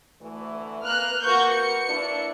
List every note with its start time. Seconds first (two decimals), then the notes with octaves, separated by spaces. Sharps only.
0.21 D2 E3 A3
0.83 A#3 B4 F6 F#6
1.22 A#3 F#4 A#4 B4 C#6 G6
1.52 C#7
1.89 A#3 D4 E4